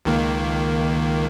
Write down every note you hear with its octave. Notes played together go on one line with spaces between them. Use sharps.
C#2 D#3 A#3